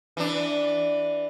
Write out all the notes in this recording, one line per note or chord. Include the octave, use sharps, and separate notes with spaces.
E3 D4